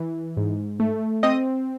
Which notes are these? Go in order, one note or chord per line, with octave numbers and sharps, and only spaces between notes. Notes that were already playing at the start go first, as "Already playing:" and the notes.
Already playing: E3
G#2
A3
C4 D#5 D#6